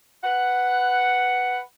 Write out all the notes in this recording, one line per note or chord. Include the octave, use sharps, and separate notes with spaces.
B4 F#5